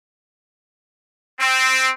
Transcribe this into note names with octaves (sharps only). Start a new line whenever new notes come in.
C4